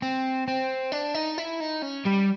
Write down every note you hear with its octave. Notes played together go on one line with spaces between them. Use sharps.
C4
C4
D4
D#4
E4
D#4
C#4
G3